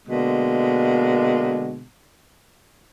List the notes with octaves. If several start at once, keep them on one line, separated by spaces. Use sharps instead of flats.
B2 D3 G#3 A#3